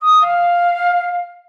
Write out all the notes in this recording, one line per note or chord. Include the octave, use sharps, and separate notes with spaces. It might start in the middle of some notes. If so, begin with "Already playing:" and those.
D#6
F5